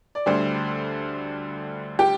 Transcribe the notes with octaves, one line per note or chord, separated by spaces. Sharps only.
D5
D2 D3 G3 C5
G4